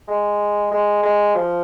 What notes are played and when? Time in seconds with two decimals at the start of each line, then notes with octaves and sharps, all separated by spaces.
0.08 G#3
0.72 G#3
1.03 G#3
1.35 F3